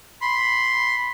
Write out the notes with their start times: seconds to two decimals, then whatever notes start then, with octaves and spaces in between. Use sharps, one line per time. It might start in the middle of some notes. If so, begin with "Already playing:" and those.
0.21 B5 C6